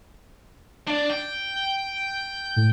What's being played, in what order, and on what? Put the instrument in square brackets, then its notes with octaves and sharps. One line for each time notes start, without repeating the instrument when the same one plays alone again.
[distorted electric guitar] D4
G5
[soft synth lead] A2